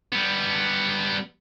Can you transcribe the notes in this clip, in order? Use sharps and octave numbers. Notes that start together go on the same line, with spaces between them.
G3 B3